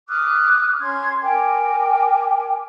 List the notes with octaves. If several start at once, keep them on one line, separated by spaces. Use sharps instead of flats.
D6 D#6 F6 F#6
C#4 C6 G#6
A#4 G5 G#5 D6